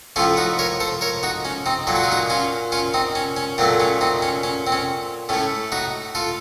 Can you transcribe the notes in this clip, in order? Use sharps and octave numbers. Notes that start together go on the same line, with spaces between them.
A2 F3 A3 C#4 F4
D#4 F#4
A#4 C#5
A4 C5
A#4 C#5
D#4 F#4
C#4
C4 D#4
A#2 F#3 A#3 A4
F#4
F4
D#4 F#4
C#4 F4
C#4 F4
C4 D#4
C#4
C#4
A#2 F#3 A3 C4
C#4
C4 D#4
C#4
C#4
C4
C#4
A2 A3 C#4
D#4 F#4
F4 A4